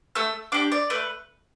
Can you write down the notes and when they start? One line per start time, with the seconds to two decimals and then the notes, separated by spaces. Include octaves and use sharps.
0.15 A3 E6
0.52 D4 G4 D6
0.72 D5
0.90 A3 B4